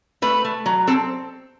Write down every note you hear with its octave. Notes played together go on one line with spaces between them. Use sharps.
A3 B4
A3
F#3
C4 A4